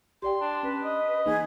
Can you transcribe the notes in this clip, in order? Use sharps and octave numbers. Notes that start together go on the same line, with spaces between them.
G4 D5 G5 C6
D4
C#4 B4
D#5
E3 A#3 D#4 G#4